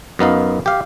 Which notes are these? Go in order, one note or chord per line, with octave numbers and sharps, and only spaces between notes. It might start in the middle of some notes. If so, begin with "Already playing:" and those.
F#2 B3 D#4 F5
G4 F5